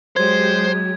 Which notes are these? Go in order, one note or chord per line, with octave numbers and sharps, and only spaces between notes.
F#3 G#3 G4 C5 G#6